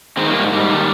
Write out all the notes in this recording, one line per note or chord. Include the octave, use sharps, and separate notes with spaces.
D#3 G#3 C4
G3 A#3
G#2
G#2 G3
D#3